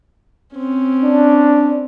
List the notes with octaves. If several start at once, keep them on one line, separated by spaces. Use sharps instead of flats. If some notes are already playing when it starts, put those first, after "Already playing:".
C4 C#4
D4